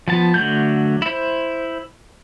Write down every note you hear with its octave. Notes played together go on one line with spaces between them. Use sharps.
F3 B3 A5
D3 F#3 A3 G6
E4 C5